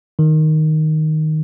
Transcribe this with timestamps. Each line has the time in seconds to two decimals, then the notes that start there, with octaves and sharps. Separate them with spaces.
0.19 D#3